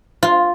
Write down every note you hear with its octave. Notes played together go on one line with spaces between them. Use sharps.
F4